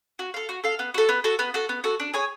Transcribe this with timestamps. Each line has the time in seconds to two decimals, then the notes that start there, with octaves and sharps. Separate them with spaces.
0.19 F#4
0.34 A4 F5
0.49 F#4
0.64 A4 F5
0.79 B3
0.94 F#4 A4
1.09 B3
1.24 F#4 A4
1.39 B3
1.54 F#4 A4
1.69 B3
1.84 F#4 A4
2.00 D4
2.14 G#4 C#5 G#5